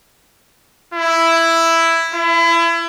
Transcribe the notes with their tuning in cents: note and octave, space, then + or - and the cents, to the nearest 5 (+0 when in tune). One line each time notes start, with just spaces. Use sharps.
E4 +5
E4 +30